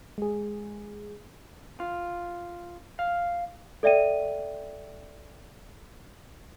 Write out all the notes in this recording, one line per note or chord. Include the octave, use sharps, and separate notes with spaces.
G#3 G#4
F4
F5
A4 D5 E5 G5 D#7